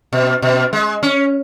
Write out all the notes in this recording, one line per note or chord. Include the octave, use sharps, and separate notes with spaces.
B2
B2
G#3
C#4